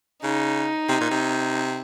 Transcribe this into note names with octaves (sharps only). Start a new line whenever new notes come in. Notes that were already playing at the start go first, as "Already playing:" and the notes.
C#3 D#4
C3
A#2
C3